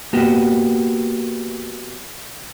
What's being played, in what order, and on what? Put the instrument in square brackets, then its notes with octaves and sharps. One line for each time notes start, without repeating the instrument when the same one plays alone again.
[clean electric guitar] A#3 B3 F#4 G4